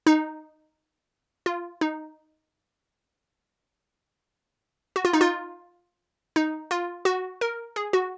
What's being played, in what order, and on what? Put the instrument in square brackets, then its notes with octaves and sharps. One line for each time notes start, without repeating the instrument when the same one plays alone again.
[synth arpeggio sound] D#4
F4
D#4
F#4
F4
D#4
F4
D#4
F4
F#4
A#4
G#4
F#4